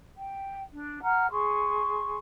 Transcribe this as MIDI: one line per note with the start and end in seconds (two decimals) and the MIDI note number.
0.16 0.62 79
0.73 1.01 62
1.03 1.31 78
1.03 1.31 82
1.03 1.31 89
1.31 2.17 68
1.31 2.17 84
1.31 2.17 85